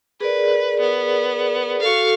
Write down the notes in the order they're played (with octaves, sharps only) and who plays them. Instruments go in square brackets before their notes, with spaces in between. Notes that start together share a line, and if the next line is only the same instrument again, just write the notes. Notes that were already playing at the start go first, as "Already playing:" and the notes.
[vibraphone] G#4 A#4 D5 [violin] B4
[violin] B3
[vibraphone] F#4 A4 [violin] F5 C#6